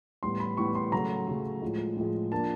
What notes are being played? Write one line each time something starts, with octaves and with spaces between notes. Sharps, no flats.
A2 E3 G3 B3 C6
B5
A2 E3 G3 B3 C#6
C6
C#3 F#3 A3 A#5
C#3 F#3 A3
A2 F3 G#3
A2 F3 G#3
F3 A#3 D4 A5